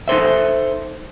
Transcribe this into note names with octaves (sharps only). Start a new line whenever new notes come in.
D#4 A4 C5 E5